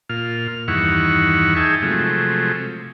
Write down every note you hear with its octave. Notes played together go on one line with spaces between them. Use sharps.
A#2 F4 F6
E2 G2 D#3 E4 F#5 C#6
D#4 G#4 E5 G5 A5
C3 F3 F#3 G#3 A3